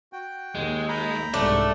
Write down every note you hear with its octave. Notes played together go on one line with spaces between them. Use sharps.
F#4 G5
D#2 G#3
A#5 B5 G6
C2 G#2 G3 A3 D4